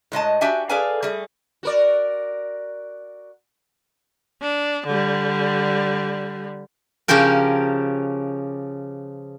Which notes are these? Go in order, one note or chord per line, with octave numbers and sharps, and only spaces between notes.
A2 G#3 D#5 A5
D4 F#4 G4 E5 G#5
G#4 A4 B4 D5 F5 G#5
G3 A3 G#4
F#4 A#4 D5
D4
D3 G3
C#3 F3 C#4 G4 A#4